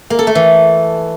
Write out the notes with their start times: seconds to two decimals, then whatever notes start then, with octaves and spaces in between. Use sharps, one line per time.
0.10 A#3
0.19 A4
0.27 A3
0.35 E3